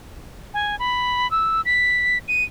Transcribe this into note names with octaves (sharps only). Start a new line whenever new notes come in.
G#5
B5
E6
B6
D#7